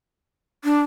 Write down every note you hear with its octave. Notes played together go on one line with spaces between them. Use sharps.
D4